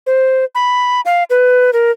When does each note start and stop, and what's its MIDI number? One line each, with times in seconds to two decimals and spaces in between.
0.07 0.45 72
0.55 1.01 83
1.05 1.24 77
1.30 1.71 71
1.73 1.91 70